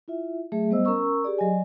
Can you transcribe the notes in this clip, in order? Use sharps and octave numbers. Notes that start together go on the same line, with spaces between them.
E4 F4 E5
F#3 A3 G#4 E5
G3 B3 C5 D#5 E6
C#4 A#4 A#5 C#6 E6
G4 G#4 D5
F#3 D5 D#5 G#5